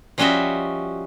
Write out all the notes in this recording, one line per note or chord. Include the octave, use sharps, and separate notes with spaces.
F3 G3 C#4 F#4 D#5 E5